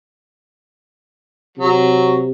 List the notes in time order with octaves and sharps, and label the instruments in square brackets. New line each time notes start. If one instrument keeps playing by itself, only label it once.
[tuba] C3 [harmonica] F#3